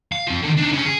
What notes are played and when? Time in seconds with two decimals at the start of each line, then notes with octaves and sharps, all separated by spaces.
0.12 F5
0.27 F3 C4
0.43 D3 D#3
0.57 D4 D#4
0.72 D3 C#4
0.86 G#4